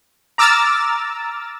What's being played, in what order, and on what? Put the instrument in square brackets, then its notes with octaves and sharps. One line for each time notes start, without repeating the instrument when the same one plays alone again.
[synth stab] A#5 D6 E6 F6 A6